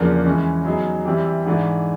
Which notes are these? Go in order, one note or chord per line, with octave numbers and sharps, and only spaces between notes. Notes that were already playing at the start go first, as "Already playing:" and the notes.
Already playing: E2 C#3 F3 A#3 D4
E3 G#3 C#4
F#3 B3 D#4 G#4
C3 E3 G3 C4
G#2 E3 A3 D4